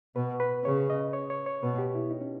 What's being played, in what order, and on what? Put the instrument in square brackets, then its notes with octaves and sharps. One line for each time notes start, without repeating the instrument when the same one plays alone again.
[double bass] B2 [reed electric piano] B4
[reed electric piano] B4
[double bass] C#3 [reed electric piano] C#5
[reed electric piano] D#5
C#5
C#5
C#5
[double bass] B2 [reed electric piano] B4
[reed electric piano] G4
E4
D#4
C#4